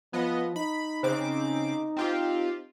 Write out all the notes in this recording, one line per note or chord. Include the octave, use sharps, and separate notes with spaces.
F3 B3 D#5
D#4 B5
C#3 C4 C5 D6
C4 F4 G4